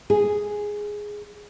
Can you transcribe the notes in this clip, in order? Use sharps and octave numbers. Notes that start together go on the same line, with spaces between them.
G#4